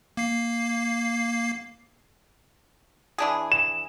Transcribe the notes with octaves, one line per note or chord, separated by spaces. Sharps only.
A#3 C7
E3 D4 G#4
E7